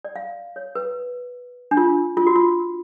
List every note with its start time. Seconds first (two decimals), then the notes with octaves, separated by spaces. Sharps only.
0.05 D5
0.16 F5
0.56 C#5
0.75 B4
1.71 D4
1.77 F4
2.17 F4
2.27 F#4
2.35 F4